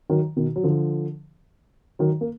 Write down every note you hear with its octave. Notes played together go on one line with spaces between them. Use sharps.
D#3 F#3
B2 D#3
F#3
D3 F3
D#3 F#3
A#3